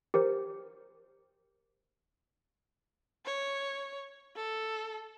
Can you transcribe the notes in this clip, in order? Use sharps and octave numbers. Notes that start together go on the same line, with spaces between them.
G4 A#4 C5
C#5
A4